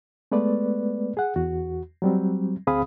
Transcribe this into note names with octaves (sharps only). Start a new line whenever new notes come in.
G#3 A3 B3 B4 D5
G#4 F#5
E2 F#4
F#3 G3 C4
D2 C4 G#4 F5 B5 D#6